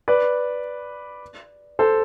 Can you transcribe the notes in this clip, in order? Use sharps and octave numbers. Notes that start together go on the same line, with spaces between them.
B4 D5
A4 C5